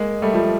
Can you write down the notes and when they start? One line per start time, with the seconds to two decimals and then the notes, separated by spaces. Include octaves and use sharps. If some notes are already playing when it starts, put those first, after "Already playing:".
Already playing: G#3 A#3
0.22 G3 A3
0.33 F3 G3